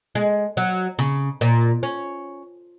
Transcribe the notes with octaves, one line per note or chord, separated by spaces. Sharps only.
G#3
F#3
C#3
A#2
C#4